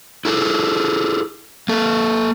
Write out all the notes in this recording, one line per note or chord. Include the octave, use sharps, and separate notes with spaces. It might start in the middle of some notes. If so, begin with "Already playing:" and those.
E4 G#4 A4
A#3 A4